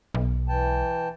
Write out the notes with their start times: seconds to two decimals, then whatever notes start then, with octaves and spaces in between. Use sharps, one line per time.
0.14 B1
0.48 E3 G5 A5